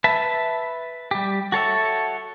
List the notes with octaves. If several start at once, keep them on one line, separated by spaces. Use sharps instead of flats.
B4 E5 A5
G3 G4
F#4 A4 C#5 E5